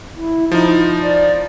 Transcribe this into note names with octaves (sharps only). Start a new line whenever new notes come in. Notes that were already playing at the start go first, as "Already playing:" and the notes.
E4
F3 D#4 E4
D5